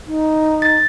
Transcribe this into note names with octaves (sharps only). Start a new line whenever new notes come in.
D#4
A6